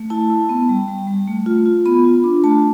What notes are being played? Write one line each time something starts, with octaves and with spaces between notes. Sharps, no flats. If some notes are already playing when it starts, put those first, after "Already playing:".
Already playing: A3
E4 A5
E4
B3
G3
G3
G3
A3
F4
F4
B3 B5
F4
D4
A3 A5